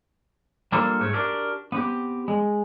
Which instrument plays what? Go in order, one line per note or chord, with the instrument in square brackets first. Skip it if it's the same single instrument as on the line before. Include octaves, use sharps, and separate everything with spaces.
[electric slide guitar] G3 A#3 D4 F4 A4 C5
G#2 A3 C#5
D4 F#4 G4 A#4
B3 C4 G4
G#3